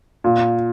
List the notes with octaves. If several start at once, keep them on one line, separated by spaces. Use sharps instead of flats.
A#2